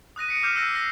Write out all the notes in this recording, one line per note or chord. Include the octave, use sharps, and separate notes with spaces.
D#6 F#6 A#6 D#7
B6 C#7 D7
D6 F6 G6 C7 E7
E6 F#6 G6 A#6 B6
E6 A#6 C7